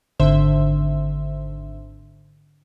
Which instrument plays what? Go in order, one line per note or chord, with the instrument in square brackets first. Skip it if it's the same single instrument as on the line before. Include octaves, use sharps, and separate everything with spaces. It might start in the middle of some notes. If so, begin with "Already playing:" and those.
[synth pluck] G#1 D3 C5 E5